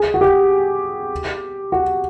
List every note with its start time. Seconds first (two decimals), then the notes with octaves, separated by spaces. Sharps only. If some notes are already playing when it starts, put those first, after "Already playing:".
Already playing: G#4
0.14 F#4
0.21 G4
1.72 F#4